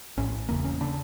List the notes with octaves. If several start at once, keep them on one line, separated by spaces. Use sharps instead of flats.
A#1 A2 C#4
F1 E2 C#3 A#3
C#4
C#3 D4